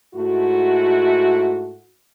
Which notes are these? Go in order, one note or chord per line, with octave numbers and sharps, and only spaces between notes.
G#2 A3 E4 F#4